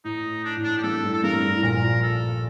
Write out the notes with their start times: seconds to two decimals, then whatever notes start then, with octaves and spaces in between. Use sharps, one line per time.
0.05 A2 D#4
0.44 D4
0.57 A2
0.64 D4
0.78 G4
0.83 G2 A4
1.04 A2
1.13 A4
1.23 G2 A#4
1.43 A2
1.56 A2
1.63 A#1 A#2 A#4
2.03 A4